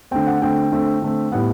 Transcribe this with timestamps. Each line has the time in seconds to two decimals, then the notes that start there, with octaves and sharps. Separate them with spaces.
0.11 D3 A3 C4 G5
0.27 F#5
0.42 D3 A3 C4 G5
0.72 D3 A3 C4
1.02 D3 A3 C4
1.32 A2 G3 B3 F#5